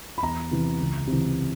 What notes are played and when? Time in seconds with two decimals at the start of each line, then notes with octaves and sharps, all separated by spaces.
0.18 B5
0.22 E2 A#5
0.51 C3 E3
0.80 C#2
1.07 C3 E3